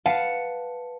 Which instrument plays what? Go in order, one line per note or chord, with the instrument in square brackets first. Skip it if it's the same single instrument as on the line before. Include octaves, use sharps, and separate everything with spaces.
[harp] B4 F5 F#5 A5